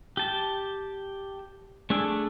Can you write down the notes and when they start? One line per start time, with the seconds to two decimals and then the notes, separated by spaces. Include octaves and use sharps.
0.17 G4 A5
1.90 A3 D4 G#4 A4